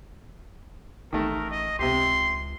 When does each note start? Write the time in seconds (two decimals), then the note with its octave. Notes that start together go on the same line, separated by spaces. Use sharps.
1.13 A1 D#3 A3 A#4
1.51 D#5
1.79 C#2 C3 G4 C6